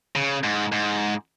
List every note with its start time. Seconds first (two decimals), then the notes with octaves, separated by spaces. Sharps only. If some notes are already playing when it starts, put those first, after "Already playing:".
0.16 C#3
0.44 G#2
0.72 G#2